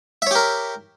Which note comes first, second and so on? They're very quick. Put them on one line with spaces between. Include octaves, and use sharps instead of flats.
E5 C#5 G4 A#4